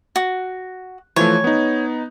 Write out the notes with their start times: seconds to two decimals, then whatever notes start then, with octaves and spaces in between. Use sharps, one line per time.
0.16 F#4
1.16 E3 F3 A3 C#5
1.44 B3 D#4